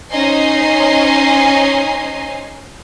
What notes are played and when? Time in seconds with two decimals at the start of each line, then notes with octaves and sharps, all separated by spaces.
0.10 C#4 D#4 C5 D#5 G#5 C7